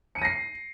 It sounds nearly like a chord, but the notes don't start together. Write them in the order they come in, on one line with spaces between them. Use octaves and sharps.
C#7 D#7 A#6 C7